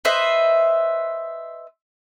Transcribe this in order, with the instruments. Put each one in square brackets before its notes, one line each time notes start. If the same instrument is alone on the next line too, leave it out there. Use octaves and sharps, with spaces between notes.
[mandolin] B4 C5 D#5 E5